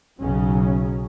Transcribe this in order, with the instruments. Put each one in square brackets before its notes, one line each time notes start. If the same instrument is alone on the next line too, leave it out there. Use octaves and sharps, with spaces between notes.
[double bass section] B1 C#3 F#3 C#4